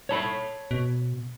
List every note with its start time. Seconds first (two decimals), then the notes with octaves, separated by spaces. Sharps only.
0.09 C#5 A5 B5
0.71 B2